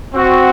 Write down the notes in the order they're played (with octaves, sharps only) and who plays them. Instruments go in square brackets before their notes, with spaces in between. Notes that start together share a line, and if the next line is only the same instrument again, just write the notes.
[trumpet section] C4 F#4